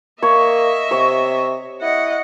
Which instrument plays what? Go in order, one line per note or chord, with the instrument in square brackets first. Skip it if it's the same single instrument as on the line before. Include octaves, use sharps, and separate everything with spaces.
[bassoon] A#3 [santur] C#5 [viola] D#5 E5
[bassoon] C3 [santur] C#5
[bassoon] E4 [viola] D#5 F#5